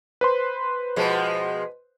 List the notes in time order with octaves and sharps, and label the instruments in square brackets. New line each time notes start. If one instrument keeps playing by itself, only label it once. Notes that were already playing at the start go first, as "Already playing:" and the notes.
[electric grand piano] B4 C5 C6
[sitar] B2 F3 G#3